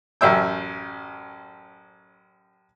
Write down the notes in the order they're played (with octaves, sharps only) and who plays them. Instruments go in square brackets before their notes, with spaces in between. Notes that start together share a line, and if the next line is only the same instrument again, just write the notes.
[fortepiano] A1 F#2 E5 G5